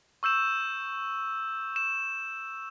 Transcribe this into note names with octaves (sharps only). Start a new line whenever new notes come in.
C#6 E6 G6 E7
E7